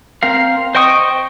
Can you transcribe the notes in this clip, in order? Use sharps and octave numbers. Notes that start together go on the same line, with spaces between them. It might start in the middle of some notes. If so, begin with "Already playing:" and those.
C4 A#4 F5
C5 D#5 G5 C#6 D#6